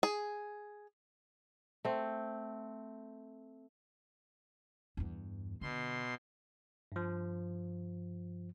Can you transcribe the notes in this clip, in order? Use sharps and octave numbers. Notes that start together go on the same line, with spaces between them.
G#4
A3 C4
E2 G2
B2 D3 C6
G2 F3